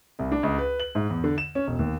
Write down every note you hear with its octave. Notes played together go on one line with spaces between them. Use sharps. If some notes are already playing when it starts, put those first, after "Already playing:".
C2
D4
C#2
B4
F#7
G#2
E2
D3
E7
C#4
E1
D#2